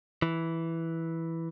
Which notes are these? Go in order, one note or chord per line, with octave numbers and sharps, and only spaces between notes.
E3